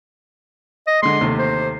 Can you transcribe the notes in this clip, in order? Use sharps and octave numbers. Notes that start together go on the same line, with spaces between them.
D#5
D3 G#3 C6
D#2 C3 A3
C5